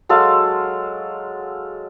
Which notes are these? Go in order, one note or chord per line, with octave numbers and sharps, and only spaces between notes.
F#3 G#3 A4 F5